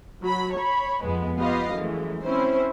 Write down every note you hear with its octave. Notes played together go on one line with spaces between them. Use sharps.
F#3 B5
C#5 B5
F2 G#3 B3
B3 F4 G4 B4 D#5 F5
F#2 E3 G#3 A3
C4 C#4 E4 C5